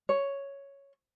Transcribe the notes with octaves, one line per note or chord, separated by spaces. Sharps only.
C#5